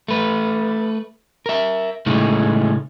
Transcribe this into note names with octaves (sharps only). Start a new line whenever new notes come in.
A3 B4
A#4 E5
A2 C#3 G#3 A3 D#4